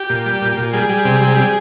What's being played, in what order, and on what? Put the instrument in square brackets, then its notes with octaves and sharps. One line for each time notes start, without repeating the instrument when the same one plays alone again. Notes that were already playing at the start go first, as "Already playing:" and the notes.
Already playing: [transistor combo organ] G4
A#2
G3
A#2
A#2
G3 G#4
G3
C3
G3
G3